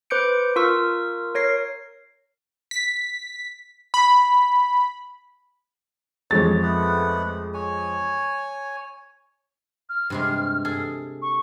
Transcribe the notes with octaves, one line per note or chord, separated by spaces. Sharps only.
B4 C5 D6 G6 C#7 D7
F4 A#4 C#6 E6
A#4 C#5 A#6 C7
B6
B5
F2 G#3 C#5 A6
A3 B3 F#5
C#5 G#5
F6
G2 C3 G#3
G#4 A4
C#6